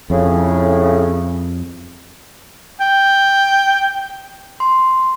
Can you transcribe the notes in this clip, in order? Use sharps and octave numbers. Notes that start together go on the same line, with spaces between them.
F2 A2 C#3
G5
C6